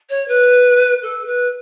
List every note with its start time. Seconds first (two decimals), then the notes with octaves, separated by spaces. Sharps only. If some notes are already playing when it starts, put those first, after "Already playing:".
0.09 C#5
0.27 B4
1.02 A4
1.25 B4